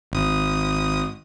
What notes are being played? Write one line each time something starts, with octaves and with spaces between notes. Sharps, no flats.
G#1 D#6